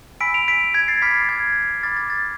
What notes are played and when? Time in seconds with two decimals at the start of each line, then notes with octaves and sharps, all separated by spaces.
0.21 G#5 B5 E6 B6 D7
0.34 D7 F7
0.48 B6 D7
0.74 G#6 B6
0.88 A6 C7
1.02 B5 D6 F6 G#6 B6
1.15 A6
1.29 G#6
1.83 B5 D6 F6 A6
1.97 A6
2.10 A6